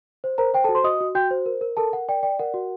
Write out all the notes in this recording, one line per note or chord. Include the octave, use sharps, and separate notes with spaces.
C5
A#4 C5 A#5
C5 G5
A4 A5
F#4
C5 C6
F#4 D#5 D#6
F#4
F#4 G5 G6
C5
A#4
A#4
A4 A#4 A5
A#4 F#5
D5 G5
D5 G5
A#4 F#5
F#4